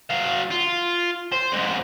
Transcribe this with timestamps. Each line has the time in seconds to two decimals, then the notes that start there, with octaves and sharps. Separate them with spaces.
0.10 F#3 F5
0.51 F4
1.32 C5
1.52 F2 G#2